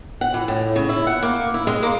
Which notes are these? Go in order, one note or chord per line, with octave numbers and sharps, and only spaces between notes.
F#5
E3
A2
C#3
E4
F#5
A#3
E4
G#3
A#3